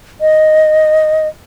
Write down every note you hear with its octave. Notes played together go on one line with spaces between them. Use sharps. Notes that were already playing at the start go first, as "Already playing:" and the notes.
D#5